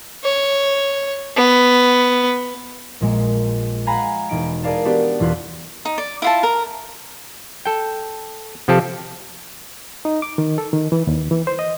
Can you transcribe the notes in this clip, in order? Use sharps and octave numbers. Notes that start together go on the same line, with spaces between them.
C#5
B3
A#1 A#2 G#3
F5 F#5 G#5 A#5 B5
E1 D#4 D7
G#4 A#4 D5 F5 A5
B3 D4 F#4 G4 D5
E1 E2 F4 F5 F#6 B6
D#4
D5
E4 F4 A5
A#4
A4 G5
C3 F3 C4 G4 A4
D#4
D6
D#3
A4
D#3
E3
D#2
E3
C5
D#5